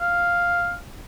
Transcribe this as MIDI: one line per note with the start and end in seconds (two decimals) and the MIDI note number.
0.01 0.75 77